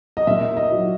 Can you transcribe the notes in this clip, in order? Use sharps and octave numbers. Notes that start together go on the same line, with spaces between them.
D#5
A#2 E5
D#5
F#3